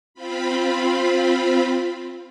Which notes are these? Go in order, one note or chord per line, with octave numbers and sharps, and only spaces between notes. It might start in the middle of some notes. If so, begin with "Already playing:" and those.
C4 F4 B5